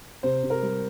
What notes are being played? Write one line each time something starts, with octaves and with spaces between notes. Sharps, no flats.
C3 C5
C3
A#4
G3